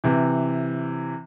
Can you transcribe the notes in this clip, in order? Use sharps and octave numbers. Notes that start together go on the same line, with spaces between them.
C3 E3